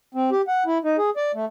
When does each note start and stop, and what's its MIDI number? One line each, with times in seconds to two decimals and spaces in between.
0.15 0.30 60
0.31 0.41 67
0.48 0.63 78
0.66 0.78 64
0.84 0.97 63
0.98 1.10 68
1.17 1.32 74
1.34 1.45 57